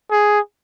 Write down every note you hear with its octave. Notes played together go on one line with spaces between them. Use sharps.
G#4